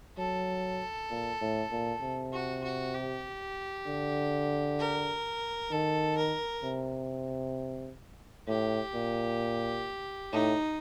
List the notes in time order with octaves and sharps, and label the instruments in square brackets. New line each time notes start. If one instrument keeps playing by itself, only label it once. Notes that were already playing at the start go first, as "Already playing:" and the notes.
[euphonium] F#3 [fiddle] A4
[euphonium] A#2
A2
A#2
C3
[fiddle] F#4
F#4
G4
[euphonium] D3
[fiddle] A#4
[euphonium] D#3 [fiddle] A4
[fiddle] A#4
[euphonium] C3
[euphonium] A2 [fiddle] G4
[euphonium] A#2
[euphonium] A2 [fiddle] D#4